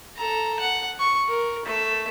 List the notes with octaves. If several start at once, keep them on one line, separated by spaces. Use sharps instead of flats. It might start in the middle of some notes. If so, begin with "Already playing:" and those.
A4 A#5
F#5
C#6
A#4
A3 E5